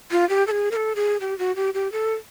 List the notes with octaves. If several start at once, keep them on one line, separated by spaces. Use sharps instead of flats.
F4
G4
A4
G#4
A#4
A4
G#4
G4
F#4
G4
G4
A4